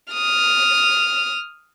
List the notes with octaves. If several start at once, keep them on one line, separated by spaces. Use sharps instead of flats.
D#6 F6